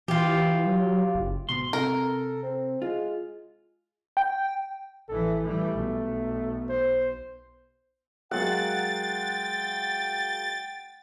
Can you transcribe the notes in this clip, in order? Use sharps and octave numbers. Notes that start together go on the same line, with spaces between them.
E3 F4 G4
F#3
F#1
D2 G#2 B2 C6
C3 A4 A#4
C4
G#3 F4
G5
A1 E3 A4
E3 G3 A3
B1
C5
F#3 G#3 A#3 F#5 G5 A6